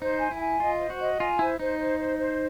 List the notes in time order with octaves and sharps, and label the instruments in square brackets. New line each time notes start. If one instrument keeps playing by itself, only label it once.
[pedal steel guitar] D#4 [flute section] C5
[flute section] G#5
[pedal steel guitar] E4
[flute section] G#5
[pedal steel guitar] F4 [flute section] D#5
[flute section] C5
[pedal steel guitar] F#4
[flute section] D#5
[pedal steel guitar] F4 [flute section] G#5
[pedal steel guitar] E4 [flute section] C5
[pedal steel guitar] D#4 [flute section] C5
[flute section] C5
C5
C5